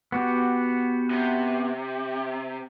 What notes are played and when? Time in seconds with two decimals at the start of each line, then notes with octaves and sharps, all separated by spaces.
0.12 B3 F#4 G4
1.11 C3